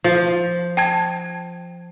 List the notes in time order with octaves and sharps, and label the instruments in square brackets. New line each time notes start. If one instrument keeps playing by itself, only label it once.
[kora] F3
[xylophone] G5 A5 G#6